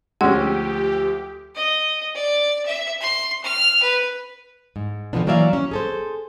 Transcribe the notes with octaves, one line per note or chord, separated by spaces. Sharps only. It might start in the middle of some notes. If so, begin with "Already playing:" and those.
D2 F3 G#3 C#4 G4 F#5 E6
D#5
D5
E5
C6
F6
B4
G#2
D3 D#3 F3 B3 D4
E3 F#3 A#3 D5 E5 F5
C#4
G#4 A4 C5